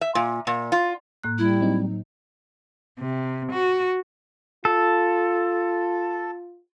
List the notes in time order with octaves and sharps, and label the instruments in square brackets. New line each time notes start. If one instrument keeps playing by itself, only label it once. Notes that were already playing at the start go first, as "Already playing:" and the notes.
[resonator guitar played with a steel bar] E5
A#2
A#2
F4
[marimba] A2 A#3 F#6
[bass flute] G3 [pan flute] E4
[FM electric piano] F#3 C4 D#4
[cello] C3
F#4
[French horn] F4 [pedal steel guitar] A4